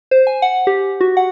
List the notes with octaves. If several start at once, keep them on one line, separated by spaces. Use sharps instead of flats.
C5
G#5
F#5
G4
F#4
F#5